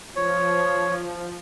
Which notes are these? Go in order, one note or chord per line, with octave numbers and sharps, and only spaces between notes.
F3 C#5